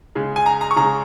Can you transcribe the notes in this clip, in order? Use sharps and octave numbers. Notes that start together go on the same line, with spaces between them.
C#3 G#3
G#5
A#5
A#5
C#6
C#3 G#3 A#5